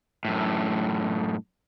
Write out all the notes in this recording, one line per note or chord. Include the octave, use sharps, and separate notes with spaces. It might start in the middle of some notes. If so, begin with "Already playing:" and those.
F#2 A2